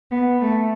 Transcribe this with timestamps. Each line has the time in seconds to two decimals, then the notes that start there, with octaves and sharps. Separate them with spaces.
0.11 B3
0.40 A3